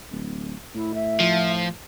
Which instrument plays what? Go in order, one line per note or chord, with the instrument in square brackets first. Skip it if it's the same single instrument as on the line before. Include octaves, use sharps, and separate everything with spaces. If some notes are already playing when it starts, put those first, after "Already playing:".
[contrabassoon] D1
[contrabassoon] A2 [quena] E4
[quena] E5
[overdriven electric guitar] F3